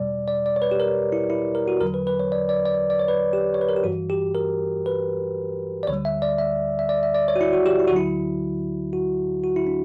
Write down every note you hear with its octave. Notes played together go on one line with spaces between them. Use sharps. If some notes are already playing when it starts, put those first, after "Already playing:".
Already playing: E2 B2 G3 D5
D5
D5
C#5
B4
G4
A#4
E4
E4
A#4
F#4
E2 D3 F#3 A#4
B4
B4
C#5
D5
D5
D5
D5
C#5
B4
G4
C#5
B4
A#4
G4
G2 E3 G3 F#4
G4
A#4
B4
D5
D2 D3 G3 C#5
E5
D5
E5
E5
D5
E5
D5
C#5
F#4
E4
F#4
G4
E4
F#4
D2 D3 F#3 E4
F#4
F#4
E4
D4